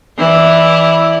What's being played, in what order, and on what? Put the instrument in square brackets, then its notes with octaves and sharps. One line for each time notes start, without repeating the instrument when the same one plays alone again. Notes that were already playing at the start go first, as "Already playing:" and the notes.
[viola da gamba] E3 E4 D5